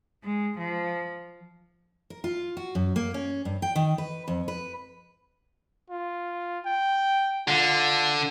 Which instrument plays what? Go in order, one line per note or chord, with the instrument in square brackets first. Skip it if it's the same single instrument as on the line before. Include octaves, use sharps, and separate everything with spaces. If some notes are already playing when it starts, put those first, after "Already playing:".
[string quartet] G#3
F3
[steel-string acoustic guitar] A#4
F4
F#4
F#2
A#3
C#4
G2
G5
D#3
B4
F2
B4
[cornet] F4
G5
[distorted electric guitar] D3 [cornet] F4